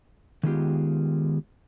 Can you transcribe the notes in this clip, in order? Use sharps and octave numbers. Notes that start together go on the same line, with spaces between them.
D#3 F#3 G#3 B3 F4 G4